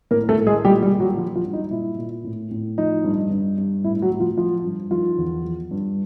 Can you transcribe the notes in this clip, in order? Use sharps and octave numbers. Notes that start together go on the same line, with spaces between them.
A2 A#3 A#4
A3 A4
A2
G#3 G#4
A#2 G3 G4
G3 G4
A#2
F#3 F#4
F3 F#3 F4
F3 F4
G2
D#4
A#2 E4
A#2
A2
A2
F3 D#4
G2
G2
G2
A2 E4
F#3 F#4
A2
F3 F4
F3 F4
G2
D#3 F3 F4
E2
F3
G2